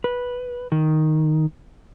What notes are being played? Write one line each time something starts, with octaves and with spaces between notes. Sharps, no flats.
B4
D#3